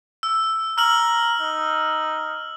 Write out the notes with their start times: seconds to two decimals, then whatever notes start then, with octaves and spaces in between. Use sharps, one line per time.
0.23 E6
0.78 A#5 E6 F6 F#7
1.41 D#4